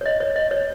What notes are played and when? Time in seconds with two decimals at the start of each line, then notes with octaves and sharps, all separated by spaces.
0.01 C#5
0.06 D#5
0.20 C#5
0.36 D#5
0.51 C#5